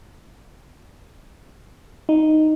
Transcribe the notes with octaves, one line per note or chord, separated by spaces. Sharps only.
D#4